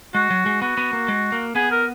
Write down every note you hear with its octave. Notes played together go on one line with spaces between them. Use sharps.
G#3 F#4
F#3
G#3
B3 F#4
B3
A#3
G#3
A#3
B3 G#4
A#4